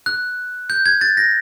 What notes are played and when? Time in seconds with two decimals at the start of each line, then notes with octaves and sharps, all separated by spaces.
0.06 F#6
0.70 G6
0.86 G#6
1.01 A6
1.17 A#6